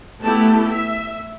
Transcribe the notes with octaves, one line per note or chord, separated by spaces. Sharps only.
A3 B3 E4 G4 A5
E5